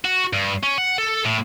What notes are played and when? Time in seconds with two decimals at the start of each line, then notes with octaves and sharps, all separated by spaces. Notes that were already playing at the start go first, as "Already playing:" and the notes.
0.05 F#4
0.33 G2
0.63 C#4
0.78 F#5
0.98 A4
1.25 A2